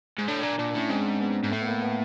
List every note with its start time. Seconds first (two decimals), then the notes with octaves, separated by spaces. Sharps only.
0.18 G#2
0.28 A2 D4
0.43 A#2
0.59 A#2 D4
0.74 A2 C#4
0.90 G#2 C4
1.21 B3
1.43 G#2
1.51 A2 A3
1.62 B3
1.67 A#3
1.82 B3